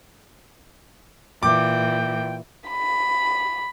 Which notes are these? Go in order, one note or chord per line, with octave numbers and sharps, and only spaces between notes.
A#2 E3 G5 D6
B5